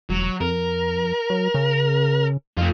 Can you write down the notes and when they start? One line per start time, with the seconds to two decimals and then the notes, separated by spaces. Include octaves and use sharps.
0.09 E1 F#3
0.41 F2 A#4
1.30 F#3
1.54 C#3
2.57 F2 A3 F4